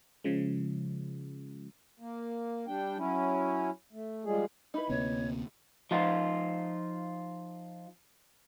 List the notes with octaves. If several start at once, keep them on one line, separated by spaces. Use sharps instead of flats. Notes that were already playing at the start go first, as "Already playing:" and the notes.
C#3 F3 G#3
A#3
G3 D4 G5
F#3 C#4 E4
A3
F3 G3 G#3 G#4
D#4 E4 B4 B5
D2 C3 A#3 C4 C#5
F3 D#4 F4